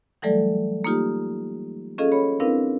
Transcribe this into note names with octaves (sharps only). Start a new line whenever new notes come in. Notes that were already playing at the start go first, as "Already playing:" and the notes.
E3 F#3 G3 A3 A4 D5
A#3 D#4 F4 G4
C#4 F4 G#4 A4 D#5 F5
C#5 B5
C4 D4 E4 A#4 B4 F5